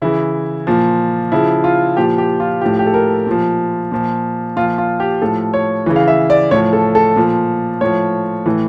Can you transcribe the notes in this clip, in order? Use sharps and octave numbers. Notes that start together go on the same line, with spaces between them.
C#3 E3 E4
A#2 F3
C#3 F3 E4
F4
A#2 F3 G4
G4
F4
A2 F3 G4
G4
A4
A#4
A#2 F3
A#2 F3
A#2 F3 F4
F4
G4
A2 F3 A4
C#5
C#3 E3
F5
E5
D5
A2 F3 C#5
A4
A4
A#2 F3
A2 F3 C#5
A2 E3